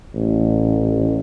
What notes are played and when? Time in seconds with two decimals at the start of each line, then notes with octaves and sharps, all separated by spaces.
0.15 A1